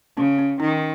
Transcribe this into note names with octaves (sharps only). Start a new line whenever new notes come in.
C#3 C#4
C#4
D#3 D#4